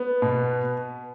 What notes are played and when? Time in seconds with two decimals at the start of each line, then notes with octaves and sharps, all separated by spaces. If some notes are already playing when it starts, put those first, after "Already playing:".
Already playing: B3
0.22 B2